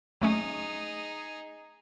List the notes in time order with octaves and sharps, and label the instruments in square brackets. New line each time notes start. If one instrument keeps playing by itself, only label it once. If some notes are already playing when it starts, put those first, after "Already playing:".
[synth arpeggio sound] F#3 A3 C#4 [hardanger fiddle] D#4 G#4